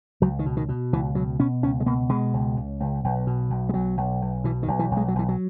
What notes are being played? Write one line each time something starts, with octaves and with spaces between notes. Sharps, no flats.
C#2 F#3
D#3
B2
D#3
B2
C#2 E3
B2 F#3
B2 C#4
C#2 C#4
G#3
B2 A#3
B2 G#3
C#2
C#2
C#2
B1
B2
B1
G#3
B1 F#3
B1
B1
B2 E3
D#3
B1
E3
B1
G#3
F#3
B1 E3
F#3